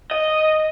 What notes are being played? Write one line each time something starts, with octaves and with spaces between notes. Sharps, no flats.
D#5